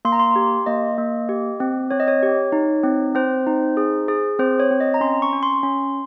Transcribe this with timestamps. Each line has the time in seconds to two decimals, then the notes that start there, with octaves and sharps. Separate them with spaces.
0.05 A#3 C6
0.12 A#5
0.20 C6
0.36 G4
0.66 A#3 D#5
0.98 A#3
1.29 G4
1.60 C4
1.91 C4 C#5
2.00 D#5
2.08 C#5
2.23 G4
2.52 D#4
2.83 C4
3.15 C4 C5
3.47 D#4
3.77 G#4
4.08 G#4
4.39 C4 C5
4.60 C#5
4.71 C4
4.80 D#5
4.94 A#5
5.01 C#4 C6
5.22 C#6
5.33 C#4
5.43 C6
5.63 C#4